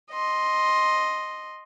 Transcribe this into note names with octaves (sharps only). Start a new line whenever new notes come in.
D#5 C6